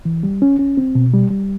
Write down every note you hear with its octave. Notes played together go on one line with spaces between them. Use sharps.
E3
G3
C#4
C#4
C4
B2
G3
G3